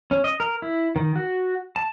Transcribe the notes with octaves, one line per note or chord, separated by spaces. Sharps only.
C#4
D#5
A#4
E4
D#3
F#4
A5